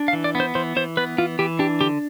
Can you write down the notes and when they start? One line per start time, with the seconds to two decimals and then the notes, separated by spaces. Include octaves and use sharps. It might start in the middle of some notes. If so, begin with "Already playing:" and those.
Already playing: D4
0.08 F5
0.13 E3
0.24 D5
0.35 B3
0.40 C5
0.55 E3 C5
0.76 E3 C5
0.97 B3 B4
1.18 E3 F4
1.39 E3 G4
1.59 D4 G4
1.81 D3 G4